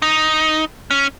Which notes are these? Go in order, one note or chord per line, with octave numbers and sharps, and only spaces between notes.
D#4
C#4